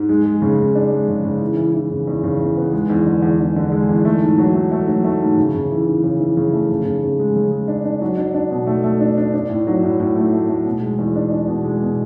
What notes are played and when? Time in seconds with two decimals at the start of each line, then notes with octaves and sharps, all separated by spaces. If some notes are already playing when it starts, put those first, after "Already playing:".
Already playing: G#2
0.09 G#3
0.25 G#3
0.42 C#3
0.59 C#3
0.75 D4
0.92 G#3
1.09 C#3
1.24 C#3
1.41 E3
1.57 E3
1.74 E3
1.91 C#3
2.07 E2
2.24 C#3
2.41 E2
2.57 B3
2.73 G#3
2.90 E2
3.06 D3
3.22 E2
3.40 E2
3.56 D3
3.72 G#3
3.89 E2
4.05 A3
4.21 G#2
4.38 F#3
4.55 A3
4.71 A3
4.87 F#3
5.04 A3
5.21 G#2
5.37 C#3
5.54 C#3
5.71 E3
5.87 E3
6.04 C#3
6.20 E3
6.37 C#3
6.53 A3
6.70 C#3
6.85 C#3
7.03 C#3
7.19 G#3
7.36 C#3
7.51 G#3
7.68 D4
7.85 D4
8.02 F#3
8.17 D4
8.34 D4
8.51 B2
8.67 A3
8.84 A3
9.00 D4
9.18 D4
9.34 D4
9.49 A2
9.67 F#3
9.83 A2
10.00 A2
10.16 A3
10.33 A3
10.49 A3
10.66 B2
10.82 G#3
10.99 E2
11.16 D4
11.31 D4
11.48 B2
11.64 G#3
11.82 B2